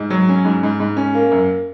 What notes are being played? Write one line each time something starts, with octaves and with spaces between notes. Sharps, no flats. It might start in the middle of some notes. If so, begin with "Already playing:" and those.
Already playing: G#2
F#3
C#4
G#2
G#2
G#2
C#4
A#3
F#2